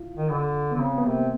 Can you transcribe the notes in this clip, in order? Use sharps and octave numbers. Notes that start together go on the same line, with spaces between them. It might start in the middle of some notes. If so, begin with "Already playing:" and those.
Already playing: E4 F4
D#3
D3
B3
D3
C#3 C4
B3
C3 A#3